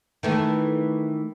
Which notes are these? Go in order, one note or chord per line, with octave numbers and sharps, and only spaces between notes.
D#3 E3 A3